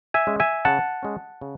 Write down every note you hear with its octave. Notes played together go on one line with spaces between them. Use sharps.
E5 G#5
G#3 C#4
E5 G#5
C#3 F#5 A5
G#3 C#4
C#3